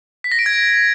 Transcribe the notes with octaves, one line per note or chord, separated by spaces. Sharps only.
B6
A#6
D7
G#6